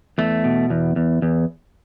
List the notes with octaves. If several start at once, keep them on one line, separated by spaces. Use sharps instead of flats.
E2 A3
B2
E2
E2
E2